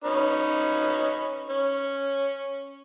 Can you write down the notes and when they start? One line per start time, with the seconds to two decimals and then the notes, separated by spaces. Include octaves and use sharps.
0.04 C#4 D#4 B4
1.50 C#4